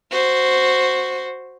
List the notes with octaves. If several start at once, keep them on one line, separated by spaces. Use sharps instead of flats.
F#4 C5